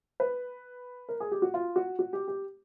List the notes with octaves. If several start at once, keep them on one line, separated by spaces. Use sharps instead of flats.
B4
A#4
G#4
G4
F#4
F4
F#4
F#4
G4
G4